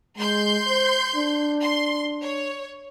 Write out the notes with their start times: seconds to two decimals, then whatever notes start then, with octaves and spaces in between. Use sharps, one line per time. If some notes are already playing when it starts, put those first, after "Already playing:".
0.18 G#3 C6 G6
0.67 C5
1.16 D4
1.62 C6
2.22 C#5